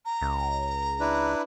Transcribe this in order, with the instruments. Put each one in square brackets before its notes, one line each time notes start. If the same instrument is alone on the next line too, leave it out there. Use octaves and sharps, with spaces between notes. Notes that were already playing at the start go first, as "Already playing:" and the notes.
[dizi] A#5
[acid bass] C#2
[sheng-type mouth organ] D4 E4 B4